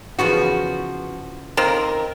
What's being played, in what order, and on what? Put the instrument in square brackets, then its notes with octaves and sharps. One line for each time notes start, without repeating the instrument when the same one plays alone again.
[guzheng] C#3 E3 B3 [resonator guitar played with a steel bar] F3 F#4
[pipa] D#3 A#3 C4 [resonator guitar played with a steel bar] A#4